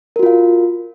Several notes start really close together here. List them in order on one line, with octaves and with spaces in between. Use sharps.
A#4 F#4 F4 F5